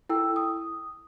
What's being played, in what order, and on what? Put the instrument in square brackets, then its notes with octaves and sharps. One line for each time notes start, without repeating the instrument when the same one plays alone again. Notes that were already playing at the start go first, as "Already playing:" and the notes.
[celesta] E4 A4 G5 E6
D#6